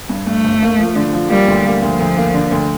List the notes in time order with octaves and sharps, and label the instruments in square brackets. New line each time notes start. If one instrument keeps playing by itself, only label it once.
[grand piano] G2
[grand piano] G2 [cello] A3
[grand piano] G1
A#3
F3
D3
F3
[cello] G3 [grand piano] A#3
[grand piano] D2
A#3
[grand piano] D2 [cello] F3
[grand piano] D2
A#3
D3
D2